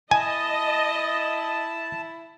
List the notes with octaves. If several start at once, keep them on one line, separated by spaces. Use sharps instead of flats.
E4 D#5 G#5 A5